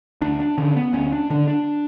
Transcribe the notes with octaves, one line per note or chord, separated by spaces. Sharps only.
D2 D4
D4
D3 C#4
B3
D2 C#4
D4
D3 D4
D4